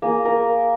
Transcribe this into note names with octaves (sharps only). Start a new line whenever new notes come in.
A#3 G#4
A#4